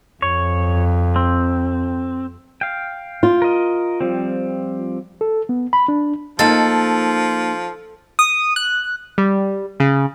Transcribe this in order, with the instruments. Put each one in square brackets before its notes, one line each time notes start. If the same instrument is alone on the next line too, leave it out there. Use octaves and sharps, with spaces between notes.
[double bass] F2 [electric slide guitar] C#5
[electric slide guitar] C4
[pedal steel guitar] F5 G5
[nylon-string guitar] F4
[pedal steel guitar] A#4 D#5
F3 G3 C4
[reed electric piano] A4
B3
B5
D4
[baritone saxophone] F3 [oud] A#3 D#4 [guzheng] A4
[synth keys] D#6
F#6
G3
C#3